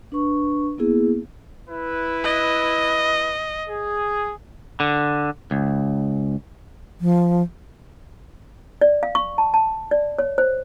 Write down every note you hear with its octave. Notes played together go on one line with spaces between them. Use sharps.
D4 B4 C#6
A#3 B3 E4 G#4
E4 B4
D#5
G#4
D3
C#2
F3
D5
F5
C#6
A5
A5
D5
C#5
C5